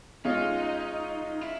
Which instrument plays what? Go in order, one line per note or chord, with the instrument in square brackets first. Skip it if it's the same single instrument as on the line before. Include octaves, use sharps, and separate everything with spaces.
[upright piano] G#3 C#4 F4 [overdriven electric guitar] D#4
[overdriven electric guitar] E4